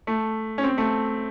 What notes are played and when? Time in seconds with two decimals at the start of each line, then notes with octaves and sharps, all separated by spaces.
0.07 A3
0.58 C#4
0.64 C4
0.78 A3